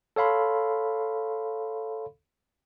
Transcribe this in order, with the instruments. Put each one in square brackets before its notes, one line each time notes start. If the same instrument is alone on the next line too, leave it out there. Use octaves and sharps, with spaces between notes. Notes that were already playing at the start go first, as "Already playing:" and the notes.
[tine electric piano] A4 C#5 F5 B5 C6